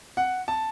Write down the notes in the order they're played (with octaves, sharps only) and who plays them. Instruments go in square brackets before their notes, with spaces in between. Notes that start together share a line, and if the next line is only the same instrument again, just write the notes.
[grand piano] F#5
A5